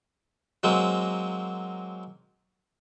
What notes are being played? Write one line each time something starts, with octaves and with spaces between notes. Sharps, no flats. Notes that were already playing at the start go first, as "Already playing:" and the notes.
F#3 G#3 A#3 C4